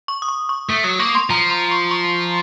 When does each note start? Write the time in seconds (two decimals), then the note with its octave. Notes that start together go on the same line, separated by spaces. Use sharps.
0.08 C#6
0.22 D#6
0.28 C#6
0.49 C#6
0.69 A3 D#6
0.84 F#3 D#6
0.99 A#3 C#6
1.15 C6
1.30 F3 A#5
1.50 C6
1.71 C#6
1.91 C#6